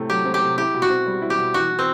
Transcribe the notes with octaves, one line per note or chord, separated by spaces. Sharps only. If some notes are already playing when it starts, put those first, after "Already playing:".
Already playing: A2 C3 A3 C4
F#3 G4
C4
G4
C3
E4 G4
B2
F#4
C4
G3
E4
G4
B2
E3 F#4
E3
C4